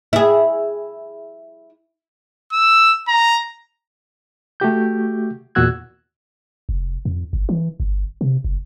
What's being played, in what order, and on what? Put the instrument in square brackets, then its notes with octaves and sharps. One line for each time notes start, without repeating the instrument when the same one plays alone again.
[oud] E4 G#4
[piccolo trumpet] E6
A#5
[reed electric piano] A3 F#4 G4 G6
E2 A#2 F#4 E6 F#6 G#6
[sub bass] F1
F2
G1
E3
G1
C3
F#1